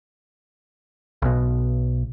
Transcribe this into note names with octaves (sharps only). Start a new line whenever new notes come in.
B1 B2